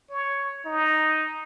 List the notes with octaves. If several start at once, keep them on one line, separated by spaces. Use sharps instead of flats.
C#5
D#4